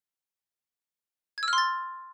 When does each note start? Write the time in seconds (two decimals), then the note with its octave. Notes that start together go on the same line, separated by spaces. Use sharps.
1.38 G#6
1.43 E6
1.48 F6
1.53 C6
1.58 A6